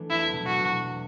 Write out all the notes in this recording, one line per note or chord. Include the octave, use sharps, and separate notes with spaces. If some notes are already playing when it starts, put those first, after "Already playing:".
Already playing: E3 A3 B3 D4
E2 E4
B2 F#3
E2 F#4
B2 F#3
E2